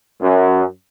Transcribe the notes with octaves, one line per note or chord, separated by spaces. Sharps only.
F#2